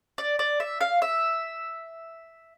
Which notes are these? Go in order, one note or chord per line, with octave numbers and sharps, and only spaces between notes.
D5
D5
E5
F5
E5